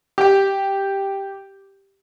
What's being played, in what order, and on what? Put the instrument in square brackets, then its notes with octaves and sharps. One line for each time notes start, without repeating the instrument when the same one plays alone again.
[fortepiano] G4 G5